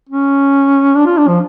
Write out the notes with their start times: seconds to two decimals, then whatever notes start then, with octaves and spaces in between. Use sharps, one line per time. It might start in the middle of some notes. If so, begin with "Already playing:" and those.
0.09 C#4
0.96 D4
1.06 F4
1.18 D4
1.28 F3